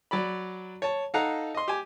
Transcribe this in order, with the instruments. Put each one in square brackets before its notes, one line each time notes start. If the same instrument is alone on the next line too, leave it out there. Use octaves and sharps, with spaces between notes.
[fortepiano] F#3 D5 B5
C#5 A5
D#4 A4 F5 F#5 A#5
D#5 C6
G4 G#5